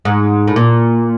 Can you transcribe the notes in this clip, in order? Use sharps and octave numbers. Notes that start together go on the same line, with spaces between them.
G#2
A2
A#2